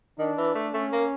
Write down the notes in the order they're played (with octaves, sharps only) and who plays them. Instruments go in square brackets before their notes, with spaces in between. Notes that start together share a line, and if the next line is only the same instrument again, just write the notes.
[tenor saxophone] D#3 [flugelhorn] D4
[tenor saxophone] E3
A3
[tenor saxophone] A3 [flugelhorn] C#4
[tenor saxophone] A#3